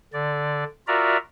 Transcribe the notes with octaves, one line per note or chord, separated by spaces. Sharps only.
D3 D5
F4 F#4 A#4 D5 E5 A#5